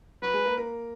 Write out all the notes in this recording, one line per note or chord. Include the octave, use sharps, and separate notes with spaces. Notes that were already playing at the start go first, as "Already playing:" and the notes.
F#3 F#4 B4
G#3 G#4
A#3 A#4
A#3 A#4